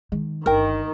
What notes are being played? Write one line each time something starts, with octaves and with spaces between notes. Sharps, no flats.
D#3 G#3
G1 D#3 D4 A#4 G5 F6